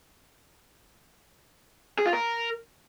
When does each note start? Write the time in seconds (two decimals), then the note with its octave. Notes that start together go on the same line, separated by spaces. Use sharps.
1.99 G#4
2.06 F4
2.13 A#4